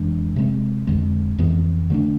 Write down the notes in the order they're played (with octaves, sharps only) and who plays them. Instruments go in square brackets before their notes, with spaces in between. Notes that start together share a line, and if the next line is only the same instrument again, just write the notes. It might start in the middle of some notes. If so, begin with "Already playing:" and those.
Already playing: [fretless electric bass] F2 E3 G#3 D4
C3 G#3 C4
F2 D3 G#3
F2 E3 B3
D3 A3 D4